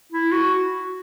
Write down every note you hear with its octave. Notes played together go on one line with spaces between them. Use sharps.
E4
F#4